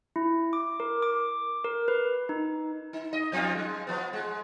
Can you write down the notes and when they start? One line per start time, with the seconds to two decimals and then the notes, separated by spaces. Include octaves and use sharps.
0.16 E4
0.53 D6
0.80 A#4
1.02 D6
1.65 A#4
1.88 B4
2.29 D#4
2.93 D#4
3.13 D#5
3.32 F2 C4 F4
3.55 G#3
3.87 F3 B3
4.13 G#3